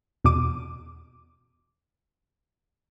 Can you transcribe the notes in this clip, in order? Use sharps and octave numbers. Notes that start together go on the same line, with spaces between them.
E2 B2 D6 D#7